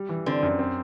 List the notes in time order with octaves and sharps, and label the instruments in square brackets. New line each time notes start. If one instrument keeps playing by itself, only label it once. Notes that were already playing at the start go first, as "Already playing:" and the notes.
Already playing: [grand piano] G3
E3
[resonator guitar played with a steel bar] D3 [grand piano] C4
[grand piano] F#2
C4